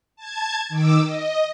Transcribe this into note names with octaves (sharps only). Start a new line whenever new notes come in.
A5 G#6
D#3 D6 E6
D#5